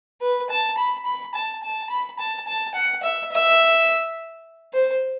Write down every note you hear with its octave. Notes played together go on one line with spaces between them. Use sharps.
B4
A5
B5
B5
A5
A5
B5
A5
A5
F#5
E5
E5
C5